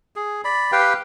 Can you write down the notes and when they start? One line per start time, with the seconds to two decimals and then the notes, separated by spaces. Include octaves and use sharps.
0.16 G#4
0.44 D5 B5
0.72 G4 B4 F5 G5